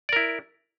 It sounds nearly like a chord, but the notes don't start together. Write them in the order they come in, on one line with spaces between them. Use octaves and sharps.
D5 A#4 E4